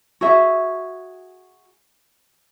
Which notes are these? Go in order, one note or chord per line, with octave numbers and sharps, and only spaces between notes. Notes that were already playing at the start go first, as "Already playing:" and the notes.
F#4 G#4 E5